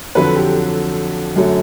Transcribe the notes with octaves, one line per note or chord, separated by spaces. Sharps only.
F2 D3 F#3 B4
G4
F#2 D3 F#3 A3